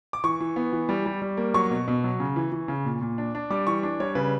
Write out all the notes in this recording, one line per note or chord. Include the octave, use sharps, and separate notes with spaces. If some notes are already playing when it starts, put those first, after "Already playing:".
D6
E3 C#6
E3
B3
E3
G3
G3
G3
A#3
F#3 C#6
B2
B2
F#3
C#3
E3
E3
C#3
A#2
A#2
D4
D4
G3 D6
E3 C#6
D4
G3 C#5
C#3 B4